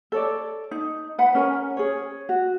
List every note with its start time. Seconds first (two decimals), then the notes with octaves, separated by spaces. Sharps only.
0.12 A4 C#5 D5
0.71 D#4
1.18 B4 F#5 B5
1.35 C#4 A#4 G#5
1.77 G#4 C#5
2.29 F#4